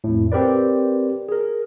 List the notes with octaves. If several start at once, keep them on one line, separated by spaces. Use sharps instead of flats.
F2 A2
C4 G4 A#4 B4 D5
G#4 A#4